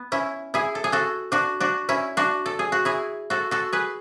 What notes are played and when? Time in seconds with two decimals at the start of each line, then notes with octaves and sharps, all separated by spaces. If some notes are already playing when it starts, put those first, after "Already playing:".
Already playing: B3
0.12 C#4 E4
0.54 E4 G#4
0.75 A4
0.84 G#4
0.92 F#4 A4
1.32 D4 F#4
1.60 D4 F#4
1.89 C#4 E4
2.17 D4 F#4
2.46 A4
2.59 G#4
2.72 F#4
2.85 E4 G#4
3.30 F#4 A4
3.51 F#4 A4
3.73 G#4 B4